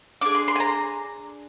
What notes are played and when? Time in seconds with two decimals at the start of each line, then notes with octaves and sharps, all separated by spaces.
0.21 D4 G#4 D6
0.35 C6
0.48 C6
0.56 G#5
0.60 A#5